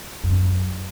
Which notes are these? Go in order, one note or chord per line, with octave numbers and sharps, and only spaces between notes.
F#2